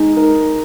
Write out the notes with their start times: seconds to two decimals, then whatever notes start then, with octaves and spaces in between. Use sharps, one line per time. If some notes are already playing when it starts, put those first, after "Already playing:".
Already playing: G#3 D#4
0.17 A#4